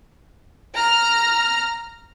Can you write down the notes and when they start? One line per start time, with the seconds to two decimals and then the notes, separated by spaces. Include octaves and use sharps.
0.75 A#5 F6